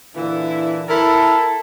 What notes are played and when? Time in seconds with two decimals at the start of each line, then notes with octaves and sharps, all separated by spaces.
0.16 A#2 D3 E3 E4
0.89 E4 A4 A#4